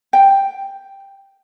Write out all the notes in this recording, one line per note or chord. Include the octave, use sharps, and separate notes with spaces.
G5